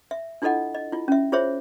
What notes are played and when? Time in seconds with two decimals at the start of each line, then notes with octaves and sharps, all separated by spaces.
0.11 E5
0.42 D4 E4 F4 A4 D#5 F#5
0.75 D#5
0.92 E4 F4
1.08 C#4 E5
1.32 F4 G#4 C5 C#5 E5